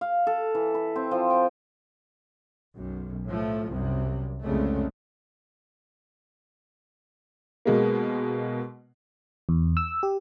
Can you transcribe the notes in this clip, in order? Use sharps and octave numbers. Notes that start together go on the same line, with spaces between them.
F5
A4
E3
B4
C4
F3
G5
B1 F#2
A2 F3 A3
C2 F#2 C3
C2 F2 C#3 G#3 A3
B2 G#3 A#3
E2
E6
G4